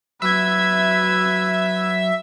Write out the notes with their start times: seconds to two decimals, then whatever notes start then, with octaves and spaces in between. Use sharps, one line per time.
0.22 F#3 B4 E5 G#6